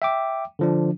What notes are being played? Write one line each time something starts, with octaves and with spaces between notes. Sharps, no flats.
E5 G5 D6
D3 F3 D4